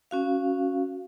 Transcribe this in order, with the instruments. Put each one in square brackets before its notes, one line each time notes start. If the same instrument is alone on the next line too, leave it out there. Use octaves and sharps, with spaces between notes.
[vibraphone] C#4 F#4 F5